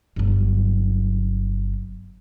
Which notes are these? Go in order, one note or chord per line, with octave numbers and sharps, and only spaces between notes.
G1 F#3